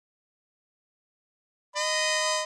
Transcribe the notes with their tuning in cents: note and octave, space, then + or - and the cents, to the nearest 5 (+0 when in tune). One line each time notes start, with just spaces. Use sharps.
D#5 -5 B5 +35